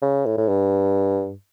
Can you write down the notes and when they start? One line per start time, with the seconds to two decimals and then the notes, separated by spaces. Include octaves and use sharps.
0.02 C#3
0.26 A2
0.37 A2
0.48 G2